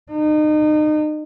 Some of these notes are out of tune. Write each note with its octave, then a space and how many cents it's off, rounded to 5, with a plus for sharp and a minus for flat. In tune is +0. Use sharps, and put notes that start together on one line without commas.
D#4 -35